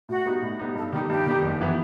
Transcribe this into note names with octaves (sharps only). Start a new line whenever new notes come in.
A2 F#4
G3 B3 D#4
A2
G3 B3 D#4
G2 A4
D#3 G3 D#4 G4
G2 G4
D#3 G3 D#4
F#1
E3 B3 E4